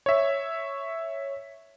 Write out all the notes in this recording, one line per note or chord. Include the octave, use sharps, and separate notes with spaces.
C#5 E5